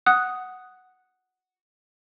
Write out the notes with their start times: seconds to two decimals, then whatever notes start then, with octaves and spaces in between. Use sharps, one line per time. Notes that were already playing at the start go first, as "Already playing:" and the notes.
0.06 F#5 D#6 F#6